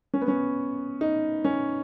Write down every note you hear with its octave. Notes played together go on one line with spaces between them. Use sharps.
C#4
B3
C#4
D#4
C#4